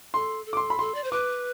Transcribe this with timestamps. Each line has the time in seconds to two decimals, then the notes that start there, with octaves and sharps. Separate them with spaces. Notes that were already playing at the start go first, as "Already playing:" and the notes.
0.14 A4 C6
0.46 A4
0.53 D6
0.57 C6
0.70 B5
0.79 A4 C6
0.95 D5
1.04 C5
1.12 B4 D6